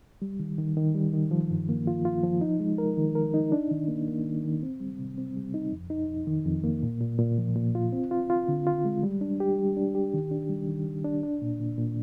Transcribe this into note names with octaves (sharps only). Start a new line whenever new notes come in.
G3
D#3
D#3
D#3
G3
D#3
F3
G2
A#3
F4
F4
F3
D#4
G#3
A#4
D#3
A#4
D#4
D4
D#3
A#3
A#3
D#3
D#3
C4
G3
C3
C4
G3
D#4
F2
D#4
F2
D#3
F2
A#3
A#2
A#2
A#2
F3
A#2
F4
C4
F4
F4
D3
F4
G#3
G3
D4
G4
G3
D4
G4
D#3
D4
G3
D#3
D#3
D4
D4
A#2
A#2
A#2